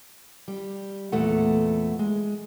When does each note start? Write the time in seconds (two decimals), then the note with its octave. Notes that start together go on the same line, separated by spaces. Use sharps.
0.48 G3
1.12 E2 A#2 A3 F#5
1.99 G#3